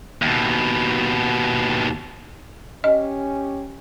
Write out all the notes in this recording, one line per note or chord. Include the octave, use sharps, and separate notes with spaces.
D#2 B2
C#4 G4 D#5